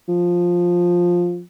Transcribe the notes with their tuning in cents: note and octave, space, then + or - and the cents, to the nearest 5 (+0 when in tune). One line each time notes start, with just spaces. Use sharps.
F3 +10